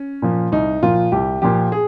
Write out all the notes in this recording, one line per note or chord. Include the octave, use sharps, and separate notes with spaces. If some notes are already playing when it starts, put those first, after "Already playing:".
Already playing: C#4
A#2 F3
C2 D#4
A#2 F3 F4
C2 G4
A#2 F3 G4
G#4